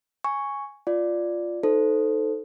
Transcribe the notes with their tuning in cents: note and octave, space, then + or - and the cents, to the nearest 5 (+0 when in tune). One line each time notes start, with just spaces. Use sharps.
G#5 +0 C#6 +0
F4 +0 D5 +0
D#4 +0 A4 +0 C5 -15